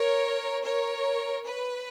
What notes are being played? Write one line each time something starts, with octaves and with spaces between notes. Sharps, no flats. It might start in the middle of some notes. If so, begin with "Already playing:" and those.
Already playing: A#4 C#5
A#4 C#5
B4